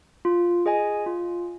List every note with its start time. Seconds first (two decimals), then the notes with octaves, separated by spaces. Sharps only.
0.25 F4
0.66 G#4 D#5 G#5
1.06 F4